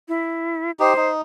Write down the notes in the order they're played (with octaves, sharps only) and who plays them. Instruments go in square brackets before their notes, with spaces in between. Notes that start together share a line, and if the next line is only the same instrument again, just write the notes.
[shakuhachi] E4
[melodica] D#4 G4 [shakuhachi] C5
[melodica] D#4